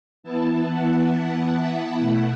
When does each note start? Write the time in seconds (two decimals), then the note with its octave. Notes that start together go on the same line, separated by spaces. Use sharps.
0.23 E3 B3 E4 A5
0.67 F#5
1.55 E5
1.99 B2 A3 E4 F#5